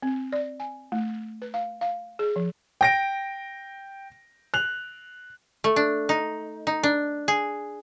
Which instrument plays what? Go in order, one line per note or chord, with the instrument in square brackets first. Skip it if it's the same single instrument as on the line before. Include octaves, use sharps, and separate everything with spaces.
[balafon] C4
D5
G#5
A3
B4
F5
F5
G#4
F3
[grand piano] G5 A#6 D7
F#6 F7
[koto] A3
D4
D#4
D#4
D4
G#4